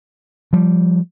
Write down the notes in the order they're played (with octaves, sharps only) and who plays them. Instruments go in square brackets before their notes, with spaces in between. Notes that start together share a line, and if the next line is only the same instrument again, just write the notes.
[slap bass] F3 G3